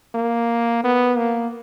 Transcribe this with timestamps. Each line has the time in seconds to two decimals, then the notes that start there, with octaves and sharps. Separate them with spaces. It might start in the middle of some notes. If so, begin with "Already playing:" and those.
0.15 A#3
0.84 B3
1.18 A#3